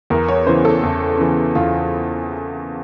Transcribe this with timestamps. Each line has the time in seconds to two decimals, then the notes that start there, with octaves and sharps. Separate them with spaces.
0.10 E2 A#4
0.28 C#5
0.47 C#3 E3 C5
0.65 A4
0.83 E2
1.18 C#3 E3
1.55 E2 F4